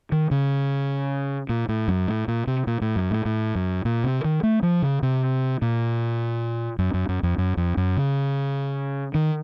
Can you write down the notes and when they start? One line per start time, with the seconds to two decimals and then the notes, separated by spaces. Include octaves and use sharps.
0.12 D#3
0.31 C#3
1.49 A#2
1.69 A2
1.88 F#2
2.08 A2
2.28 A#2
2.47 C3
2.67 A#2
2.81 A2
2.96 F#2
3.11 A2
3.25 A2
3.55 F#2
3.85 A#2
4.04 C3
4.24 D#3
4.43 A3
4.63 F3
4.82 C#3
5.03 C3
5.62 A#2
6.79 F#2
6.94 F#2
7.09 F#2
7.23 F2
7.38 F#2
7.57 F2
7.77 F#2
7.97 C#3
9.14 D#3